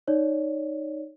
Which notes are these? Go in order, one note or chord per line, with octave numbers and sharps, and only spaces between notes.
D#4 C#5 D5